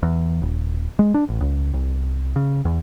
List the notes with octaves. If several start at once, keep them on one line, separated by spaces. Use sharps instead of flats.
E2
D#1
G#3
D4
A1
C#2
C2
C#3
E2